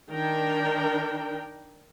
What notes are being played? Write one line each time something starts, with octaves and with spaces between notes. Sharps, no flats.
D#3 D4 A#4 G5